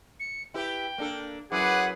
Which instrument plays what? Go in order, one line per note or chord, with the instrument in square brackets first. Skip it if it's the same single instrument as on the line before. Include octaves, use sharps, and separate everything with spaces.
[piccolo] C#7
[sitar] E4 G4 B4 [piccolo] G5
[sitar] A#3 D4 A4
[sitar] F#2 E4 [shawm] G#4 [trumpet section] B4 F#5 [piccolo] D6